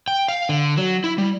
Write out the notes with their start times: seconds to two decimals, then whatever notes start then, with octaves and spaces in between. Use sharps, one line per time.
0.08 G5
0.28 F5
0.49 D3
0.77 F#3
1.04 E4
1.18 G3